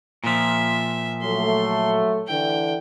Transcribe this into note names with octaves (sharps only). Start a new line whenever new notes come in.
A#2 F3 E5
F#3 A3 C6
D3 E3 G5